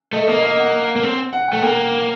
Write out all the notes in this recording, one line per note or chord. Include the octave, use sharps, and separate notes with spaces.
A3 D#5
A#3 D#5
D#5
F#5
A#3
C4
F#5
A3 G5
A#3 G5